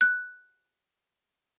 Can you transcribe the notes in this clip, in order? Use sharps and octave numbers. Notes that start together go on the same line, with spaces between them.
F#6